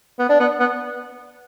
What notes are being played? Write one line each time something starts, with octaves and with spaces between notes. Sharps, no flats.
B3
D4
B3
B3